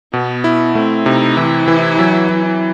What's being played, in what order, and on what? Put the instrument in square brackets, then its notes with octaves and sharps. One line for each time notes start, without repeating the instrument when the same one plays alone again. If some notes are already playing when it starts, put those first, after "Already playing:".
[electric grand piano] B2 [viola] B3
[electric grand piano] E4
[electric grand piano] A3 [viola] C4
[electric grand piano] C3 [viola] D#4
[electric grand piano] E3 [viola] E4
[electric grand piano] E3
F#3
F#3